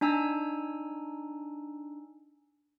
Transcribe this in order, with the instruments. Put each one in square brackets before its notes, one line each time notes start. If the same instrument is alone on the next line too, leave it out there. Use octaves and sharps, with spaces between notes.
[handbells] D4 D#4 G#5 A#5 E6